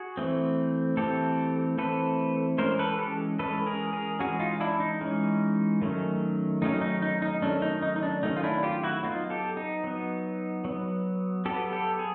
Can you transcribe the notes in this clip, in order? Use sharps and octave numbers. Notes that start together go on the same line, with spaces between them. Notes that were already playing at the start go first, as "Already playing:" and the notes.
Already playing: F#4 G#4
E3 A3 C4
E3 A3 C4 G4 A4
E3 A3 C4 A4 B4
E3 G#3 C#4 A#4 C5
A4 B4
G4 A4
E3 G#3 C#4 A4 B4
G#4 A#4
G#4 A#4
E3 G#3 C#4 F#4 G#4
D#4 F4
D4 E4
D#4
E3 G#3 C#4
D#3 F#3 A3 C#4
D#3 F#3 A3 C#4 D#4
D#4
D#4
D#4
D#3 F#3 A3 C#4 D4
D#4
D#4
D#4
D4
D#3 F#3 A3 C#4 D#4
F4
D4 E4
F4 G4
E4 F#4
F#3 B3 D#4 F4
G4 A4
D#4
F#3 B3
F#3 B3
F#3 B3 G4 A4
G4 A4
G#4